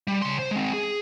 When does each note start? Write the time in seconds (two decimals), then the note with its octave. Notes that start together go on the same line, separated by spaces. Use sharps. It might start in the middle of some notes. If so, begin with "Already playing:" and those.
0.08 G3
0.22 C#3 C6
0.39 C5
0.51 G#3 C4
0.73 G#4